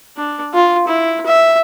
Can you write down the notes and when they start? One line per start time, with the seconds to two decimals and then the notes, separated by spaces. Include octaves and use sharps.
0.17 D4
0.54 F4
0.87 E4
1.27 E5